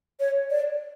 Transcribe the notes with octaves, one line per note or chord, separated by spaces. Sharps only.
C#5
D5